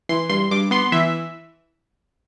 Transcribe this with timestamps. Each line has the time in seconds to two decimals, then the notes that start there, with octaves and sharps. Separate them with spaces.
0.09 E3 C6
0.29 G2 C6
0.51 G2 D6
0.71 B3 C6
0.92 E3 E5